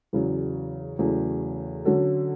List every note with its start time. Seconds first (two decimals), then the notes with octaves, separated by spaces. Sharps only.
0.13 E2 C#3 F#3
0.99 E2 C#3 F#3 A3
1.85 D3 F#3 C#4 F#4 A4